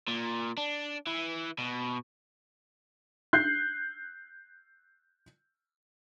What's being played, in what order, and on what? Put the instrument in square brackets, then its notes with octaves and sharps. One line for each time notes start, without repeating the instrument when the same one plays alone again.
[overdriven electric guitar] A#2
D4
E3
B2
[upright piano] F#6 G6 C7